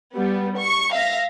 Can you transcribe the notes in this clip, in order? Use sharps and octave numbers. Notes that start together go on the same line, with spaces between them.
G3 B3
C#6
E5 F5 A#6